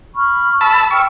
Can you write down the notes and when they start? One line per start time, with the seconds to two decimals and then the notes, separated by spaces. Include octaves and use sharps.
0.14 B5 C#6 F6
0.61 A5 B5 E6
0.91 G5 C#6 E6 F6